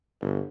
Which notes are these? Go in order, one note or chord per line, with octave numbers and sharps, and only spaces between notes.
G1